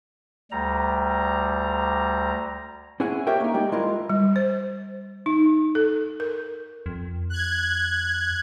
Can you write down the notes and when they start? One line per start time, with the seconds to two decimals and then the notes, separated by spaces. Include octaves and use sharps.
0.51 D2 G3 A#5
3.00 C#4 E4 G#4 F#5 G#5
3.27 G4 A#4 C#5 E5 G5
3.40 A#3 D#4
3.54 G3 G#3 G4
3.72 G#3 E4 F4 A#4
4.09 G3
4.36 C5
5.26 D#4
5.75 A4
6.20 A#4
6.86 F2
7.30 F#6 G#6